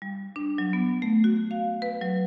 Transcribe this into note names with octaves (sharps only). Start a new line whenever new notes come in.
G3
D4
F#3
B3
A3
F#4
F5
B4
F#3